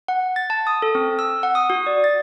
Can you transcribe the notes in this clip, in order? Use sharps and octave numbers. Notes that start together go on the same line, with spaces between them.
F#5
A6
A5
D#6
A4
C4
E6
F#5
D#6
F#4
D5
A6